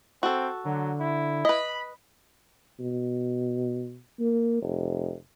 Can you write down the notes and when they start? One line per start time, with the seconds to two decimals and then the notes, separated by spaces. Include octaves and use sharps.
0.23 C4 F#4 A4
0.65 D3 F#3
1.00 E4
1.45 B4 D#5 B5
2.79 B2
4.20 A#3
4.62 F1